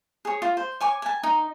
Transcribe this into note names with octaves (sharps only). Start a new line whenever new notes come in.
G#4 C#5
F4
C5
C#5 G#5 C#6 D6
G#5 A5
D#4